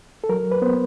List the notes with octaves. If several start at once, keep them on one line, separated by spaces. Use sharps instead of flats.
A4
F#3 A#4
B4
B3 C5